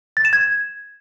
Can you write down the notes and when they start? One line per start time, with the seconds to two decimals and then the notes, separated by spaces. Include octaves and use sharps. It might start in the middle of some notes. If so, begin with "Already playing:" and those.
0.17 A6
0.25 E7
0.33 G#6